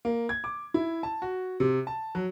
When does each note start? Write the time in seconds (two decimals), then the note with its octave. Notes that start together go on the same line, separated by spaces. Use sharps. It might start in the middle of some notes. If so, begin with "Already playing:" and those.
0.05 A#3
0.29 G#6
0.44 D6
0.74 E4
1.03 A5
1.22 F#4
1.60 C3
1.87 A5
2.15 F#3